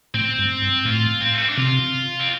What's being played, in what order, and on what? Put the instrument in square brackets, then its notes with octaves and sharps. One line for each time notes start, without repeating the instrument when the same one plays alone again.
[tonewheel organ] A2 [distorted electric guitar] C4
[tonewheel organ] G2
G2
[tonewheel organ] A2 [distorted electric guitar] F4
[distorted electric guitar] C4
A3
C4
D4
[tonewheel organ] C3 [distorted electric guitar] F4
[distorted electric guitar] C4